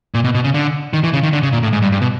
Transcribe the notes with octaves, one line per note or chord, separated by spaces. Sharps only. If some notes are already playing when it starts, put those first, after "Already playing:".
A#2
B2
B2
C#3
D3
D#3
E3
C#3
D#3
D3
C#3
A#2
A2
G#2
G2
G2
B2